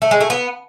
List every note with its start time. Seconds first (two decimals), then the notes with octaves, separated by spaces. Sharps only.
0.02 A3
0.11 G#3
0.21 A3
0.30 B3